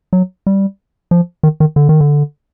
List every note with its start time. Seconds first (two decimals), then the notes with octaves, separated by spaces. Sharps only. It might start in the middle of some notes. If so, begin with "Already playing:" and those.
0.13 F#3
0.47 G3
1.11 F3
1.43 D#3
1.60 D#3
1.76 D3
1.89 D#3
2.01 D3